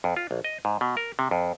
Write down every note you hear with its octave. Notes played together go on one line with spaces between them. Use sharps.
F2
F4
A#1
D#5
G#2
B2
A#4
C3
F2